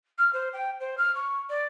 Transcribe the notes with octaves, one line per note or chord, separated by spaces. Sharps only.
F6
C5
G5
C5
F6
C#6
D5